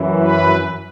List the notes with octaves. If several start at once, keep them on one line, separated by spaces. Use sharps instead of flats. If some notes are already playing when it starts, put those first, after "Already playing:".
Already playing: F#2 E3
B4